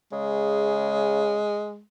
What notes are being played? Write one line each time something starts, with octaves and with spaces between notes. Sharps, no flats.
C#3 G#3